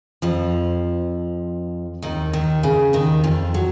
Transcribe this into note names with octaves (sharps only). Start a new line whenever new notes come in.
F2 F3
D#2 D#3
D#2 D#3
C#3
D#2 D#3
F2 F3
F#3